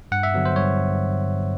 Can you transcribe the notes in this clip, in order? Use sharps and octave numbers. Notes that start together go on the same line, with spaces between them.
G2 F#5
E5
D3 F#3 B3
C5
G2 C#5